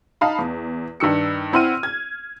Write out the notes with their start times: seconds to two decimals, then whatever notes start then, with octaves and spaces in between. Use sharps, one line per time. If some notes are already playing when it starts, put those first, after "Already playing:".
0.21 D#4 F5 A5 B5
0.38 E2
1.00 G2 D#3 E6 C#7
1.53 C4 E4 F#5 C6 F6 D#7
1.83 G#6